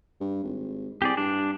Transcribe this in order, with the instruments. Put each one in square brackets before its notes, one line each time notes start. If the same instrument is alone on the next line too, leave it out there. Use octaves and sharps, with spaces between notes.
[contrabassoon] G2
G#1
[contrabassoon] C2 [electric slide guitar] G4 G#4 D5
[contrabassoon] G2 [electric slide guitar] D4